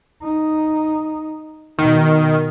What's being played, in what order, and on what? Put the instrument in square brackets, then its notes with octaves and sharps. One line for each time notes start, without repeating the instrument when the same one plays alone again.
[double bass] D#4
[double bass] B2 [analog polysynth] D#3